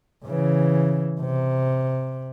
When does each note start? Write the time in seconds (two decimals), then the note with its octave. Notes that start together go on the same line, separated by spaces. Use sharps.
0.24 C#3 E3
1.21 C3